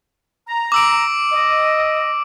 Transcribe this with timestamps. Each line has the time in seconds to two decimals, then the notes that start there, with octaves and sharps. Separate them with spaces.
0.48 A#5
0.72 D6 E6 D7
1.31 D#5